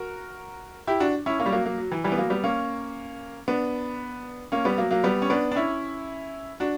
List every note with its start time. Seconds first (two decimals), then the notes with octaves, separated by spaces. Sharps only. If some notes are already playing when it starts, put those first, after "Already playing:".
Already playing: F#4 A#4
0.87 E4 G4
1.00 D4 F#4
1.26 C#4 E4
1.39 A#3 C#4
1.46 G3
1.52 F#3 A#3
1.66 F#3 A#3
1.78 F#3
1.92 E3
2.04 E3 G3
2.12 B3
2.18 F#3 A#3
2.30 G3 B3
2.44 A#3 C#4
3.48 B3 D4
4.52 A#3 C#4
4.65 G3 B3
4.78 F#3 A#3
4.91 F#3 A#3
5.04 G3 B3
5.22 C#4
5.30 B3 D4
5.51 D4
5.56 C#4 E4
6.60 D4 F#4